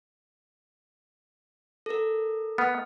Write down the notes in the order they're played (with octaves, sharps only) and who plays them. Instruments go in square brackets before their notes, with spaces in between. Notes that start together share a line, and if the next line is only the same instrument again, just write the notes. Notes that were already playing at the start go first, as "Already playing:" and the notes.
[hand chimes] A4 A#4
[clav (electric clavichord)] B3 [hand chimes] F6